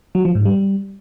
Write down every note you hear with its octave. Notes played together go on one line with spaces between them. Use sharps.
F#3
F3
G#2
G3